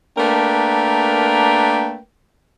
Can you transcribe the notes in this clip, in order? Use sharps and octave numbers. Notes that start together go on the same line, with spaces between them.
A3 A#3 D4 A#4 B4 G5